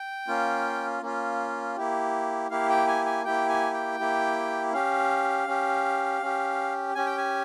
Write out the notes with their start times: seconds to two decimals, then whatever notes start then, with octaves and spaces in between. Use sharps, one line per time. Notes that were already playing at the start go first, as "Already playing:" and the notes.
Already playing: G5
0.28 A#3 C#4 F4
1.02 A#3 C#4 F4
1.77 A#3 E4 G4
2.51 A#3 E4 G4 F5
2.69 G5
2.87 G#5
3.06 G#5
3.25 A#3 E4 G4 G5
3.49 G#5
3.74 G5
3.99 A#3 E4 G4
4.73 C#4 G4 F5
5.47 C#4 G4
6.22 C#4 G4
6.95 C#4 G4 G#5
7.06 G5
7.17 G#5